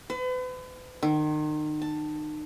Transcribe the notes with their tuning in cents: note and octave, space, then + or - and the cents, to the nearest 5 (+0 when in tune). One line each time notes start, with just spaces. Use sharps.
B4 +40
D#3 -35
A5 +10